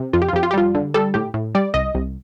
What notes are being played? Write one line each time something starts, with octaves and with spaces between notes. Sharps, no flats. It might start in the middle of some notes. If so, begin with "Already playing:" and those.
Already playing: C3
F2 F4
G4
F4
F2 G4
F4
G4
G3 F4
D3
G3 A4
A2 G4
A2
G3 D5
C2 D#5
C2